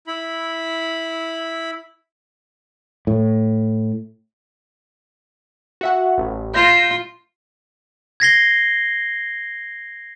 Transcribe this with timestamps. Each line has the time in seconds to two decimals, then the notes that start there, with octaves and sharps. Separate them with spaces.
0.07 E4 B5
3.07 A2
5.81 F#4 E5 F#5
6.18 A1
6.54 F4 G6 A#6 E7
8.20 G#6 A#6 C7 G7